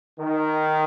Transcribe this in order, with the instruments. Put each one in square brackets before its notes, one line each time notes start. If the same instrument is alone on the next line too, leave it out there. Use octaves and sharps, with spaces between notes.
[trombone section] D#3